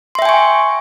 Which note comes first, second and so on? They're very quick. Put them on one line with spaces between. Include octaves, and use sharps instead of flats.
C6 E5 G5 G#5 C#6